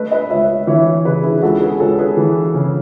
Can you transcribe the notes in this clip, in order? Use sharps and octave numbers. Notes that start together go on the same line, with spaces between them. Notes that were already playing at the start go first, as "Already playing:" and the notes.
Already playing: A3 B4 D#5
B4 D#5
C#2 C#5 E5
E3 C#5 E5
C#3 G#4 B4
E4 G#4
C#2 F#4 A4
G#4 B4
C#2 A4 C#5
G#4 B4
E3
C#3